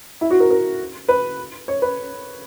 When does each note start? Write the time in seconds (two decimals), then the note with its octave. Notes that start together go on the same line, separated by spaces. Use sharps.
0.21 E4
0.31 F#4
0.40 A#4
0.50 A#4
1.09 B4
1.68 C#5
1.82 B4